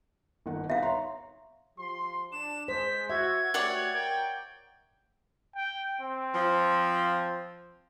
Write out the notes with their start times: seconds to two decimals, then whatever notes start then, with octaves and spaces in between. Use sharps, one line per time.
0.46 G1 D#3 F#5
0.70 B3 D#4 E5 F5
0.82 C#5 A#5 C6
1.78 F3 G4 C6
2.32 D4 E7
2.68 G#3 C5 B6
3.10 F#4 E5 G#6
3.54 A3 F#4 G4 C#5 D5 F#5
3.94 A#4 G5
5.56 G5
6.01 C4
6.34 F3